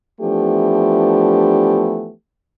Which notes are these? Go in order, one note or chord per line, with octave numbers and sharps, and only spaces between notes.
E3 F3 A3 B3 D4 G4